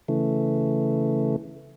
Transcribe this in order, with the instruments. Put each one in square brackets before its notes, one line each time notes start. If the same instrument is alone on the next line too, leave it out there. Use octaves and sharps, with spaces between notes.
[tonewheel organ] C#3 E3 A3